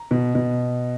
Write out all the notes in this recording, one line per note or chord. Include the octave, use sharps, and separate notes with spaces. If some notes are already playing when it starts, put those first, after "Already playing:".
Already playing: A#5
B2
B2